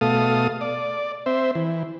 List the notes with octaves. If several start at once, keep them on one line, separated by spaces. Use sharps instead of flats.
B2 A3 A4 F5 D#6
D5
C4 C5 E5
E3